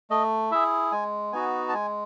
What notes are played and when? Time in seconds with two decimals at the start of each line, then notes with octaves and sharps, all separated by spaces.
0.10 A3 D#5
0.51 E4 G#4 E5
0.92 G#3 G#5
1.32 B3 D#4 F#4 G#5
1.69 A5
1.74 G#3 G#5